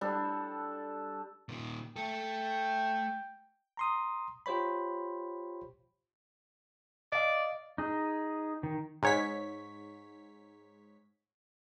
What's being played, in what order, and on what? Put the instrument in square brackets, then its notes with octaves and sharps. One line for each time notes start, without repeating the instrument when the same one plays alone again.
[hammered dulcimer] G3 D4 A4
[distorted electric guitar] A#2 D#3
[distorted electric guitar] A3 A4 [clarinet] G5
[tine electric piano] A#5 C6 D#6
F4 G4 C5 C#5 B5
[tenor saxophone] D5 [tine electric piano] D#5 F5
[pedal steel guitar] D#4 G#4
D#3
[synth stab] G#2 C#5 B6